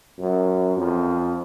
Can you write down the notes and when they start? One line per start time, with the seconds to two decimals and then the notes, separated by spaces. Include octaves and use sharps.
0.19 F#2
0.77 F2